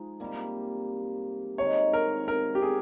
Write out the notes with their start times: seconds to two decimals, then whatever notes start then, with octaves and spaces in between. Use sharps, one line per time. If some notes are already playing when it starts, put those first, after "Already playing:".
Already playing: F3 G#3 D#4
0.20 C3 G3 A#3
1.58 C3 D#3 G#3 C4 C#5
1.93 A#4
2.28 A#4
2.55 G4
2.62 G#4